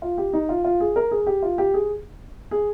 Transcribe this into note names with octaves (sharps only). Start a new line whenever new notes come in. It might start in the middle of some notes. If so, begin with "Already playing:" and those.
F4
G4
D#4
F4
F4
G#4
A#4
G#4
G4
F4
G4
G#4
G#4